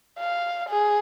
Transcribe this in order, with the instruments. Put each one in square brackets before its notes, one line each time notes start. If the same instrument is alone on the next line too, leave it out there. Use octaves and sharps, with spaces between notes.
[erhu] F5
G#4